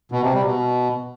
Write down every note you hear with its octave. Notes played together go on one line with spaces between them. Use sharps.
B2
C3
G3
B2